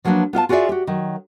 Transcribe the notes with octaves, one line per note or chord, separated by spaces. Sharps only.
F3 F#3 A#3 D4 B4
B3 F4 F5 A5
F4 F#4 G#4 A4 D5 E5
F#4 G4
D#3 F#3